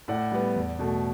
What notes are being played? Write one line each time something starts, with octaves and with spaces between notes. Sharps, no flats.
A2 D5 F#5
G3 B3
E2
B2 A3